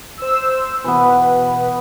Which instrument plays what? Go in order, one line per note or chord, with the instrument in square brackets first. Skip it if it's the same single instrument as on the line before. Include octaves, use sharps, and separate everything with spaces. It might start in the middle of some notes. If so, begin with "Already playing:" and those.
[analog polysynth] C5 E6
[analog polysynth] B2 B4 [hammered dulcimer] E3 B3